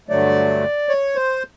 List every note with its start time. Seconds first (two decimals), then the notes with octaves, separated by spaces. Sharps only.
0.09 G2 D3 F#3 A3 D5
0.89 C#5
1.15 C5